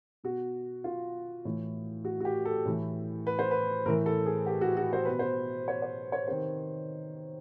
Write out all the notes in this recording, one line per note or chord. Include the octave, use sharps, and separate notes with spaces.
B2 F#4
F4
A2 E3
F#4
F#4
G4
A4
A2 E3
B4
C5
B4
A2 E3 A#4
A4
G#4
G4
F#4
F#4
C5
B2 B4
C5
C#5
C#5
C#5
C3 D#3 C5